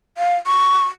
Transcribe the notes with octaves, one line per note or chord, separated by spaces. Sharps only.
F5
C#6